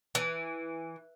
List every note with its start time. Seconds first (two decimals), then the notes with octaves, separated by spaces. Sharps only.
0.15 E3